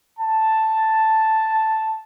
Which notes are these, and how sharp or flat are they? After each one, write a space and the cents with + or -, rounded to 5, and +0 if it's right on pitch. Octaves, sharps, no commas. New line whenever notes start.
A5 +0